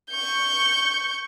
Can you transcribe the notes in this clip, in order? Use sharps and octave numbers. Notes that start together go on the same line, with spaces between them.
C#6 G6